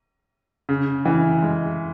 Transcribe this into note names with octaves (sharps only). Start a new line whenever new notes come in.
C#3
E3
G#3